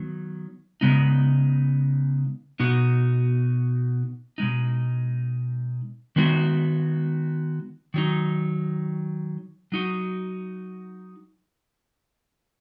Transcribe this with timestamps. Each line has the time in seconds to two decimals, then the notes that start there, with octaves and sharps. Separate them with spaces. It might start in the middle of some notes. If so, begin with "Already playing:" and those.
Already playing: D#3 F#3 B3
0.81 C#3 G#3 B3 D#4
2.59 B2 B3 D#4 F#4
4.38 B2 G#3 D#4
6.16 D#3 G#3 B3 D#4 F#4
7.94 D#3 F#3 D#4
9.72 F#3 D#4 F#4